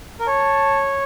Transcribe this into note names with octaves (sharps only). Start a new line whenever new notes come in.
A#4
C#5 A5